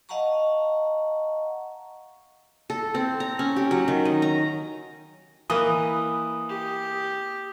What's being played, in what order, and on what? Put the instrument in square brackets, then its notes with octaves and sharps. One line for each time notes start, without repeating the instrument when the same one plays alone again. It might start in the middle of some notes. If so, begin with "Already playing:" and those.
[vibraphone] D#5 F5 F#5 A5 A#5 C#6
[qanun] A4
C4
A#5
C#4
G4
F#3
D#3
D#5
A#5
[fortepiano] E3 [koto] A#3 B4 D#5 [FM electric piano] D#6
[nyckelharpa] G4